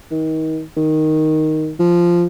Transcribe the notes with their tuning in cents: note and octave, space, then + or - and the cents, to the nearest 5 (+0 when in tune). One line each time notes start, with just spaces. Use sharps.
D#3 +30
D#3 +0
F3 -10